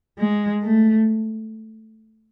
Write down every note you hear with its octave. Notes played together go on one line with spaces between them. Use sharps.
G#3
A3